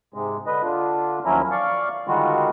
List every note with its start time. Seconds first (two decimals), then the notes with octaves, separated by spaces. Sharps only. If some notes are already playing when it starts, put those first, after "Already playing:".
0.14 G#2 C3 G#3
0.47 D3 B4 D#5
0.62 D3 D4 F4
1.25 D#2 F3 F#3 C#4 E4 A#4
1.51 D5 F5 C#6
2.07 D3 D#3 G3 G#3 F4 F#4